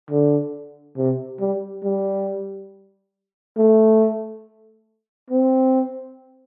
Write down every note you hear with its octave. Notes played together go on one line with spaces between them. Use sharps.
D3
C3
G3
G3
A3
C4